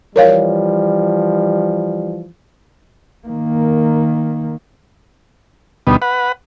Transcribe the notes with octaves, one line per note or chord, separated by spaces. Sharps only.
E3 F3 G3 A#4 C#5 F5
D#3 A#3
D2 B2 G3 B3 D#4
B4 F#5